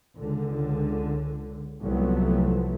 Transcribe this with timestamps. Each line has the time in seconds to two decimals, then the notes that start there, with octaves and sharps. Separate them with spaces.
0.16 C#2 D3
1.83 C2 F3 F#3 A3 B3